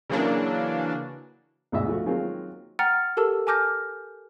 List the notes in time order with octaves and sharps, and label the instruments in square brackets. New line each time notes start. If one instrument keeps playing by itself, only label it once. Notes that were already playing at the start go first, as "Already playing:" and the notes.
[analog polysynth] C#3 E3 F#3 A#3 D4
[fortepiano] D2 G#2 B2 D#5 E5 E6
F3 A3 F#4
D#3 F#3 G#3 A#3 C4 F4
[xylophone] F#5 G5 A#5 F6 A6 C#7
G4 A4 A#4 A5 E6
G#5 A5 D6 F6 G6 A#6